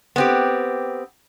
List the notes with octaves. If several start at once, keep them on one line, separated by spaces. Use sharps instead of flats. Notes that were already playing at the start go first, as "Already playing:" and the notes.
B3 C4 G4